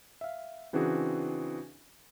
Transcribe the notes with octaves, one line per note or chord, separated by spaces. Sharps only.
E5 F5
C#3 E3 C4 D4 F#4 G#4